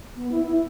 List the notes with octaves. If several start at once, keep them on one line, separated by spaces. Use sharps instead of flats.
B3
E4
E4